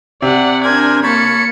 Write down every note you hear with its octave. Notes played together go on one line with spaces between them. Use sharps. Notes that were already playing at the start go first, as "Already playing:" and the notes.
C3 D5 F#5
D4 A#4 C5 G#5 G#6
A#3 C#5 A5 B5 C#7